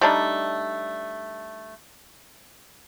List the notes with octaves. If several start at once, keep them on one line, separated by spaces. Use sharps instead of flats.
G3 A3 D4 D#4